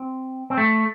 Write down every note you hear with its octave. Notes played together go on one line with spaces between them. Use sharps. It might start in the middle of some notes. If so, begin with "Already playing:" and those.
Already playing: C4
C4
A3